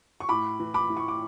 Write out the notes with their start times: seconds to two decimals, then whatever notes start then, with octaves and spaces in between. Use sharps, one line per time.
0.20 C#6
0.29 A2 B5 D6
0.59 E3
0.74 B5 D6
0.90 E3
0.97 C#6
1.08 D6